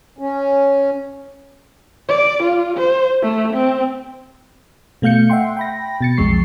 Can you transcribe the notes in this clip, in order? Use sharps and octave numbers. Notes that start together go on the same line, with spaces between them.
C#4
D5
F4
C5
A3
C4
B2 A3 F5 G6 C#7
E5 F#5 G5 C6
G5 B5 A#6
B2 A6 C#7
B1 F2 G#3 C#6 C7